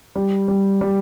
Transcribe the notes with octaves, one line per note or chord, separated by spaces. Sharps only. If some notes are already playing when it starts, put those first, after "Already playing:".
G3
G3
G3